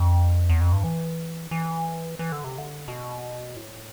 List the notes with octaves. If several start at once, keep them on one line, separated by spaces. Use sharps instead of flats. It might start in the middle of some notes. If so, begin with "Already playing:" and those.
Already playing: F2
E2
F2
G2
E3
E3
E3
D3
C3
D3
B2
A2